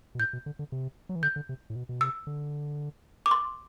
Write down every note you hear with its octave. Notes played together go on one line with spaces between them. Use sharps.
B2
A2 G6
B2
D3
D3
C3
F#3
E3
D3 G6
D3
C3
A2
B2
B2
C3 E6
D3
D6
C6